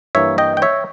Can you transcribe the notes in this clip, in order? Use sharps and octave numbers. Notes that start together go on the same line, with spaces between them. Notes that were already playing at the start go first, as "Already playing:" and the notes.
G2 E3 A#3 C#5 E5
D#5 G5
G5
C#5 E5